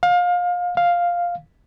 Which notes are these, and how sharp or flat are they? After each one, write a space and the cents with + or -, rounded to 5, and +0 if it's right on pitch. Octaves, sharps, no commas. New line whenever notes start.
F5 +30
F5 +5